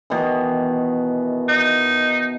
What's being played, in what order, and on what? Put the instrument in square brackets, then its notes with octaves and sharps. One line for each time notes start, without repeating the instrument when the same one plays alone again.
[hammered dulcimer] B2 D#3 E3
[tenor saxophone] D#4